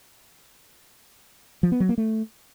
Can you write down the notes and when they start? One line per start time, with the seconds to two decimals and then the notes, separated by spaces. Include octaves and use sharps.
1.63 F3
1.72 B3
1.80 F#3
1.89 A#3
1.98 A3